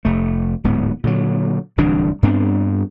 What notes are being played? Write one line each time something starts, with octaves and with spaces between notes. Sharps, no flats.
F1 A3
D1 G#2 B3
A#2 D3 F#3
D1 C2 E3 D4
G2 B3 C4 D4